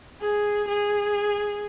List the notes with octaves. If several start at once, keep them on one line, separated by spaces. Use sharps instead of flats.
G#4
G#4